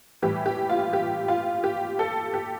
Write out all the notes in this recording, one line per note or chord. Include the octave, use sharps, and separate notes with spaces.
A2 E3 G3 G4
G4
F4
G4
F4
G4
A4
G4